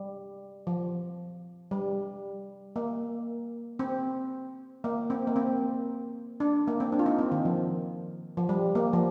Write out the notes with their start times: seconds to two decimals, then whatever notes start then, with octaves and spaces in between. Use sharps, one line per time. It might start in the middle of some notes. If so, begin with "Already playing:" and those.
Already playing: G3
0.67 F3
1.71 G3
2.76 A#3
3.79 C4
4.84 A#3
5.10 C4
5.27 A#3
5.36 C4
6.40 D4
6.68 A#3
6.80 C4
6.92 D4
6.99 F4
7.06 D#4
7.19 C4
7.32 D#3
7.45 F3
8.37 F3
8.49 G3
8.75 A#3
8.93 F3